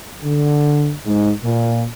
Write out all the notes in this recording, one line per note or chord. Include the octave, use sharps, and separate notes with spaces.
D3
G#2
A#2